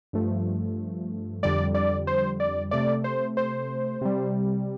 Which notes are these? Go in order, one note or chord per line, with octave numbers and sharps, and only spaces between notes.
G2 F3 A3
F2 D3 G3 D5
D5
C5
D5
C3 A3 D5
C5
C5
C3 G3